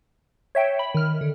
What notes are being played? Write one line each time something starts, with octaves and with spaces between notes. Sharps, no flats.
C#5 E5 G5
B5
D#3 F6
D3